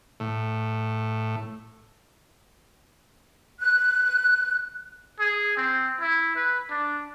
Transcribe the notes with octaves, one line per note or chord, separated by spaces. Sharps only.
A2
F#6
G#4
C4
E4
B4
D4